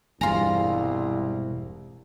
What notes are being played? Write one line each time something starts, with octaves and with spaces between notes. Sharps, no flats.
E1 C2 G2 G#3 F4 G#5 A#5